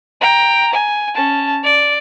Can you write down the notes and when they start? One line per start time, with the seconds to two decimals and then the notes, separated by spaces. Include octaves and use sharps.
0.21 G5 A#5
0.73 G#5
1.15 C#4 A5
1.63 D5